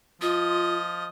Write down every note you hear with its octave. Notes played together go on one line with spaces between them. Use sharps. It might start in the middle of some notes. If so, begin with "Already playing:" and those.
F3 F4 D#5